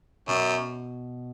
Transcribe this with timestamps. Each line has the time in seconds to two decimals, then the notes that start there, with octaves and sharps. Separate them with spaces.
0.28 F#2 B2